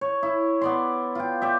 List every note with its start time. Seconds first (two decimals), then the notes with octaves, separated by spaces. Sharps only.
0.01 C#5
0.23 E4
0.61 B3 D5 C6
1.15 F4 G5
1.42 G4 D5 E5